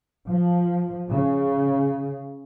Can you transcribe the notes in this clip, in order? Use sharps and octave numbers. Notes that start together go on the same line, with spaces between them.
F3
C#3